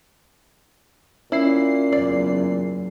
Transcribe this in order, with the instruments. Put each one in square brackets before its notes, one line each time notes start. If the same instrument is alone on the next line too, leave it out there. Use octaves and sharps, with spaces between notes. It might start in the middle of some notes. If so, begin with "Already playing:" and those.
[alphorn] A#2 [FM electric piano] C#4 C7 [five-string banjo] E4
[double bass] F#1 E2 [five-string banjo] D5